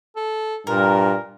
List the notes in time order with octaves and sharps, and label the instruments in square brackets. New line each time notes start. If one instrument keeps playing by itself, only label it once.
[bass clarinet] A4
[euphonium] G2 [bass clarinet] A#2 [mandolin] A#4